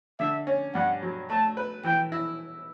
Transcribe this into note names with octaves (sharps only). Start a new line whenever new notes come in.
D3 E5
C#4
G2 F#5
F#3
A3 A5
B4
E3 G5
E4